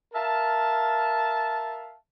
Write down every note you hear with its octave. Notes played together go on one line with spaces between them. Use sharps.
A#4 E5 F5 A5